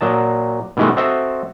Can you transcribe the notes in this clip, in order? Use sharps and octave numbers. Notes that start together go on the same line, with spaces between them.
A#2 F#3 D#5 A5
B2 D#3 E3 G#3 A3
C4 F#4 A4 C5 D#5 E5